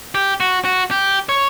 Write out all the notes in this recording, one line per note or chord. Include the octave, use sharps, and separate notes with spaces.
G4
F#4
F#4
G4
C#5